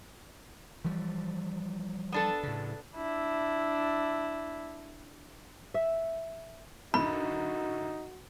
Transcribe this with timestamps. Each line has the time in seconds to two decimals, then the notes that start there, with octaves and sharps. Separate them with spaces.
0.85 E3 F3 G3
2.12 B3 D4 A4
2.43 A2 C#3
2.95 D4 E4
5.74 E5
6.94 F#2 A2 D3 D#4 F#4 B5